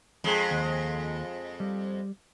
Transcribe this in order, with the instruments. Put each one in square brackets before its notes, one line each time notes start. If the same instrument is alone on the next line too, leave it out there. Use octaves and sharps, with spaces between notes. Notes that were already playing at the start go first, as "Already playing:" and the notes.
[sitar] F2 G#3
[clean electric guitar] D#2
G3